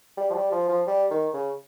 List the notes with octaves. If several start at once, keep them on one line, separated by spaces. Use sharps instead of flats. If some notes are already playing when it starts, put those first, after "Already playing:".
G3
F3
G3
F3
F3
G3
D#3
C#3